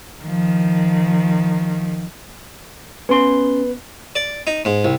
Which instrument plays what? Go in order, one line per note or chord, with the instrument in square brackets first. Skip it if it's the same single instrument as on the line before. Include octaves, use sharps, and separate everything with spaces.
[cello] D#3 F3
[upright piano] B3 [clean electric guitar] C#4 C6
[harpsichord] D5
D#4
G#2
C2